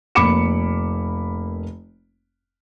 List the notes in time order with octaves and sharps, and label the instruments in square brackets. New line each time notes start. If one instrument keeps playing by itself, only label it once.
[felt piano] F1 A#3 B5 D6 C#7 E7